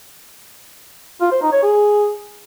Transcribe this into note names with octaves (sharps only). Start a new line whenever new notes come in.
F4
C5
D#4
C#5
G#4